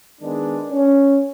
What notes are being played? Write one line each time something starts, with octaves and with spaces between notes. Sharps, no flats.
D#3 G#3 B3 D4
C#4